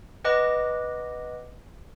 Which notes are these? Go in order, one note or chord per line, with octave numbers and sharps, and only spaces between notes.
B4 D#5 F#5 D6 F#6 A#6